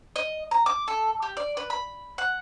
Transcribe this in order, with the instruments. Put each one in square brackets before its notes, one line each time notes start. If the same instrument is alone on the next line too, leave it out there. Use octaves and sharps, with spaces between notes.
[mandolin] D#5
A#5
D6
A4
G4
D5
B4
B5
F#5